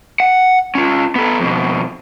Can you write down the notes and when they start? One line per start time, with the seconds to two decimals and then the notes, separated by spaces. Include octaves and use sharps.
0.20 F#5
0.75 C#4 F4
1.16 B3 A4
1.40 F2 B2